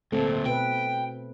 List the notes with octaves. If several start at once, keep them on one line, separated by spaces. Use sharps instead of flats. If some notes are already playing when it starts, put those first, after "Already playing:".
D2 A#2 A3 C4 A4
B2 B4 G5